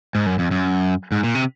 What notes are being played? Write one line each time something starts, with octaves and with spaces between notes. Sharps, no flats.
G#2
F#2
F2
F#2
G#2
A#2
C3